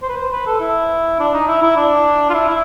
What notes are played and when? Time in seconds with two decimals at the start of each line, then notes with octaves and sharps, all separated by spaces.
0.02 C5
0.09 B4
0.17 C5
0.32 B4
0.47 A4
0.60 E4
1.20 D4
1.34 D#4
1.48 E4
1.62 E4
1.76 D4
2.30 F4
2.34 E4
2.48 E4